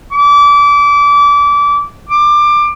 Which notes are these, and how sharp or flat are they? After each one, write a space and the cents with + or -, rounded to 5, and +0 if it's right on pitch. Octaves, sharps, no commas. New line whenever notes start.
D6 -25
D6 +20